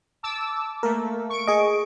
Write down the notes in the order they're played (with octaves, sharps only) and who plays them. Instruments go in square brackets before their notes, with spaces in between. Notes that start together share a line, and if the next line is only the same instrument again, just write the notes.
[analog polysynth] A5 D6 E6
[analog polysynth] A3 A#3 [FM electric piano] A#4
[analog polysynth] C#6 D7
[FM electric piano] G#4 D#5